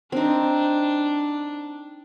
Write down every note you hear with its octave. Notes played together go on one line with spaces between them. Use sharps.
C4 D4 D#4